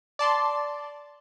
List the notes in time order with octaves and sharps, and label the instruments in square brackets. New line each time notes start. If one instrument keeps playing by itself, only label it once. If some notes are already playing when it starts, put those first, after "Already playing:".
[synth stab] D5 A5 C6